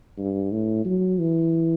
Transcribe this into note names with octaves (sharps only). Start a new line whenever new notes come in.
G2
A2
F#3
E3